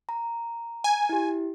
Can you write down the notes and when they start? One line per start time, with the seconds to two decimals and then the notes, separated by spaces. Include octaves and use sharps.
0.09 A#5
0.84 G#5
1.09 E4 G4